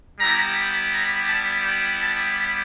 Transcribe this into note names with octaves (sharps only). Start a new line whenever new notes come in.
G3 B3 E4 G4 A#5
A#5
A5
G5
A5